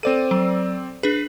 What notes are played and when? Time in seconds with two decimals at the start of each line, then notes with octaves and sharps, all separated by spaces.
0.03 C4 A4 C5 D5 D#7
0.31 F#3
1.03 D4 G#4 B4